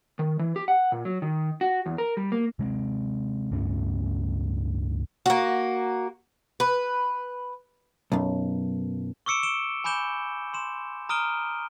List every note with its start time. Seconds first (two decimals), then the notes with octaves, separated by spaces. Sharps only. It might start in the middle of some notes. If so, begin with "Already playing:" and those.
0.19 D#3
0.39 E3
0.56 G4
0.68 F#5
0.92 A#2
1.05 F#3
1.22 D#3
1.61 F#4
1.86 E2
1.98 A#4
2.17 G3
2.32 A#3
2.59 C3 G#3 A3 C4
3.51 C#2 G2 A3 C#4
5.26 A#3 F#4
6.60 B4
8.12 B1 F#2
9.26 C#6 D6 E6 C#7 D7 E7
9.43 D7 E7 G7
9.84 G#5 B5 D6 G6 E7 G7
10.54 C6 E7
11.09 A#5 D#6 F6 D7 D#7 G7